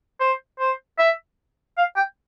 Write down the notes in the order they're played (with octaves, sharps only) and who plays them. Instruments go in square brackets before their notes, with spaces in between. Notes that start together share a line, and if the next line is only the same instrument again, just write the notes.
[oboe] C5
C5
E5
F5
G5